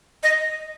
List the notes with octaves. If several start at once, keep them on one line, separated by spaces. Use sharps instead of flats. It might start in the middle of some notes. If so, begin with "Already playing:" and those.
D#5